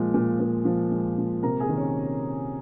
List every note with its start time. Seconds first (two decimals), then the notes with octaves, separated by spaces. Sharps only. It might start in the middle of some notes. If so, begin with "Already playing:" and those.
Already playing: A#2 F3 G#3
0.14 A#2
0.40 A#2
0.65 F3
0.91 G#3
1.18 A#2
1.43 C3 A#4 A#5
1.60 G#4 G#5
1.68 D#3
1.77 C#4 C#5